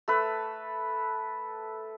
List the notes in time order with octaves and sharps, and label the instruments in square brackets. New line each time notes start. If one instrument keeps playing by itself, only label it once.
[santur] A3 A4 B4